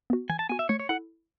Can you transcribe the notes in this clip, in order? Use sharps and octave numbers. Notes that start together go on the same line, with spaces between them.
B3 F#4
E3 G#5
A5
B3 F#4 G#5
E5
A3 C#5
C#5
E4 A4 F#5